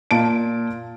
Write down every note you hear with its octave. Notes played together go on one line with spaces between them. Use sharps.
A#2 A5 D7